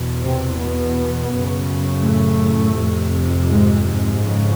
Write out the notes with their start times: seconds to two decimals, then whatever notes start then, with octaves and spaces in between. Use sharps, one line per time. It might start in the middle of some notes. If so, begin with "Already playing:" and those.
Already playing: E2 B2
0.22 C3 C4
0.58 B2 B3
1.31 F#2 C#3
2.03 A2 A3
2.75 F2 C3
3.48 G#2 G#3
3.84 G#2 G#3
4.21 F2 C#3